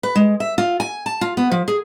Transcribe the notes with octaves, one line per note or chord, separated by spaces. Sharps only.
B4
G#3
E5
F4
G#5
A5
F4
B3
F3
G#4